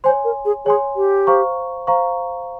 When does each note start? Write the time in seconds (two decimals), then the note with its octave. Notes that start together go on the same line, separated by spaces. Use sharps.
0.04 C5 C#5 G#5 C6
0.24 A#4
0.45 G#4
0.65 G#4 C#5 G#5 C6
0.96 G4
1.27 C5 F5 A#5 C#6
1.87 C5 F5 A#5 C#6